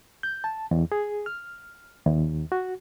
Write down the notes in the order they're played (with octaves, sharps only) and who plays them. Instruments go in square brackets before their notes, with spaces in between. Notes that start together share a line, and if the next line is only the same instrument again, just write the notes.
[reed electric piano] G6
A5
E2
G#4
F6
D#2
F#4